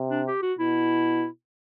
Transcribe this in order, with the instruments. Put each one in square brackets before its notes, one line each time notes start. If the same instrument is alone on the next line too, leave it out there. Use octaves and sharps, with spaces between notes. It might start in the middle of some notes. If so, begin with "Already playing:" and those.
Already playing: [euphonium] C3
[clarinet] D4
G4
F#4
[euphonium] B2 [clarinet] E4